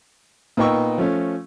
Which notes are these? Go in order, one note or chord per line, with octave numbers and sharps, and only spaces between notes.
A#2 B3 D#4 G5 C#6 E6
F3 A3 C#4